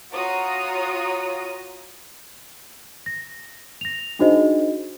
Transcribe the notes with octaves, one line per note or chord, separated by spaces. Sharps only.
F4 F#4 C#5 A#5 D#6
A#6
A#6 F7
D4 D#4 F#4 G#4 C5 D#5